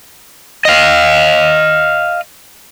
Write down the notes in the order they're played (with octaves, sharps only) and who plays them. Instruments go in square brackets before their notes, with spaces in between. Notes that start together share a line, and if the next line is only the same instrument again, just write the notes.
[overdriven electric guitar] D#5 F5